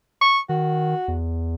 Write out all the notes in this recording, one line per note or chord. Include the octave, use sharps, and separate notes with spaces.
C#6
D#3 F#4
E2